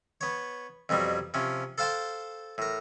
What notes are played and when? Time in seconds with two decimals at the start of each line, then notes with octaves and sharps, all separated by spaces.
0.21 B3 C#5
0.89 F2 B2 F#3 G3
1.34 C3 F3 C#4
1.78 A4 C5 F5 G5 A5 C6
2.58 A2 A#4